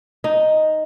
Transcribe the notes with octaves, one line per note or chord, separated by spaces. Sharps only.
D#4